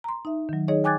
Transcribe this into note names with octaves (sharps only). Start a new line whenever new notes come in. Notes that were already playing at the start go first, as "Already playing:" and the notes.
A#5 C6
D#4 E5
D#3 F#3
D#4 G#4 C#5 D#5
G5 G#5 D6 F#6 G#6 A6